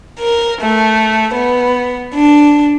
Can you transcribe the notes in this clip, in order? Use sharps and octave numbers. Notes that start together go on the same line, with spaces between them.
A#4
A3
B3
D4